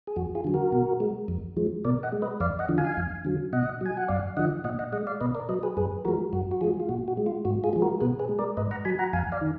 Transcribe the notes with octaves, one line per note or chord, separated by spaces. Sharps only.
G#4
F2 F#4
F4 G#4
D3 F#3
F#4 A#4
B2
G#3
F2
F3 G#3
B2 A#4 D5
D#5 F#5
G#3
B4 D#5
F2 D5 F5
D#5 F#5
D3 F3
F5 G#5
F2
D3 F#3
B2 D#5 F#5
F#3 G#5
F#5
F#2 D5 F5
D3 F3 D#5 F#5
A#2 D#5 F#5
D#5 F#5
G#3 D#5 F#5
D5 F5
B2 B4 D#5
A#4 D5
F#3 B4 D#5
G#4 B4
F#2 G#4 B4
F3 G#3 F#4 A#4
F#2 F#4
F#4
F3 G#3 F4 G#4
F4
A#2 F#4
F#4
G#3
F4
G#2 F#4
F4 G#4
F3 G#3
F#4 A#4
B2 G#4 B4
G#4 B4
G#3
A#4 D5
G#2 B4 D#5
F#5 A#5
F#3 G#5 B5
F#5 A#5
F2 F5 G#5
D5 F5
D#3